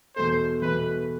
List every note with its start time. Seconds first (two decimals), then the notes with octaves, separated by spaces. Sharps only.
0.16 E2 B2 A3 C5
0.62 E2 B2 A3 B4